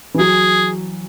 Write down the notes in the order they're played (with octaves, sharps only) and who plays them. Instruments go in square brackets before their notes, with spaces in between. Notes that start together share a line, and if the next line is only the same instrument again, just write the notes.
[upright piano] E3
[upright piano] F#3 [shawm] G#4